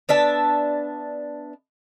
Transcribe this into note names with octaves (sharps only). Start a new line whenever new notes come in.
B3 D4 E5 A5